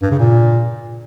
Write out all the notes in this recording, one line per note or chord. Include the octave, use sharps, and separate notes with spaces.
G2
C#3
A#2